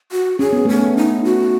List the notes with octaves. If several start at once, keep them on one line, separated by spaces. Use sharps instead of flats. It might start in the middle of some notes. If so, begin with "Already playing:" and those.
F#4
C#4 G#4
B3
A3 C#4
B3
D#4
F#4